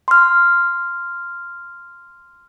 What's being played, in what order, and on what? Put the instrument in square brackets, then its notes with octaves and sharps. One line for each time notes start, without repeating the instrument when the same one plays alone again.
[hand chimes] C6 F6